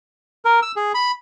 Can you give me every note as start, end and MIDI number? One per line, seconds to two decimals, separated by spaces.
0.45 0.60 70
0.62 0.72 88
0.76 0.92 68
0.94 1.11 83